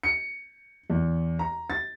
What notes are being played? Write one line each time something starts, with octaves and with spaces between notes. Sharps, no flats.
C#7
E2
A#5
A6